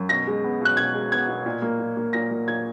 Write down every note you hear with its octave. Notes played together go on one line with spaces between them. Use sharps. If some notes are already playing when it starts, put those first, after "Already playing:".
Already playing: F#2
B2 A#6
G#3
B3
B2 F#6
B2 G#6
G#3
B3 G#6
B2
A#2
A#3
A#2
A#3
A#2 A#6
A#3
A#2 G#6